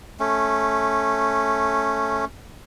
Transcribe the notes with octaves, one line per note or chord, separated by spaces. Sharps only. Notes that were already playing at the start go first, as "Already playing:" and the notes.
A3 C#4